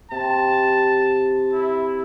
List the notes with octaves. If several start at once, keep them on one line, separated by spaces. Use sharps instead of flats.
C3 A5
E4